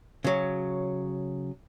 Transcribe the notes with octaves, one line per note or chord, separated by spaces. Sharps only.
C#3 F#3